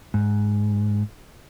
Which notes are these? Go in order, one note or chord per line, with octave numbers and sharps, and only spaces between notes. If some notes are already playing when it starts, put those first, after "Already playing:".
G#2